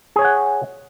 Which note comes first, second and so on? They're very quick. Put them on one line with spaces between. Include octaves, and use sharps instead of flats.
G#4 C#5 G#5 F#5